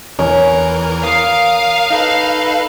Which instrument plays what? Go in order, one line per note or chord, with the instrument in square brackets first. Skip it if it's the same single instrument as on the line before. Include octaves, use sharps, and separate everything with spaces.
[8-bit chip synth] E2 E3 A#4 [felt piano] C#5 G#5
[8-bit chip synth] A#4 D#6 [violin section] F5
[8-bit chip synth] D#4 A4 B4